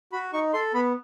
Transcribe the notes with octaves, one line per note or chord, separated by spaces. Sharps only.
F#4 B5
D#4 C#6
A4 C6
B3 B5